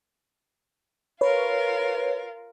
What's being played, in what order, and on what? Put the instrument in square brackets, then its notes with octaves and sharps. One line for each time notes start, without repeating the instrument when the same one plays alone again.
[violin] F4 A#4 [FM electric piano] B4 C#5